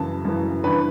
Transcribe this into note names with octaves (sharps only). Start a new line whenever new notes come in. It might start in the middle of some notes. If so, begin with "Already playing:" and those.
Already playing: F#2 C#3 E3 A5
F#2 C#3 E3
G2 E3 B4